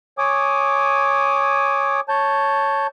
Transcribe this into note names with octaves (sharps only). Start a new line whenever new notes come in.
C#5 G#5 D6 D#6
C#5 A5 G6